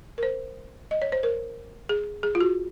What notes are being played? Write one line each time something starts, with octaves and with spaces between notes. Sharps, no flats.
A#4
C5
D#5
C#5
C5
A#4
G#4
G#4
F4
F#4